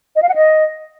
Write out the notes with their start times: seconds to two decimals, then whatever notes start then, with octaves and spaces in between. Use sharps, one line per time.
0.16 D#5
0.22 F5
0.29 F#5
0.35 D#5